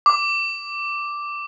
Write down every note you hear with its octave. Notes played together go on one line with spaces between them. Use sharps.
D6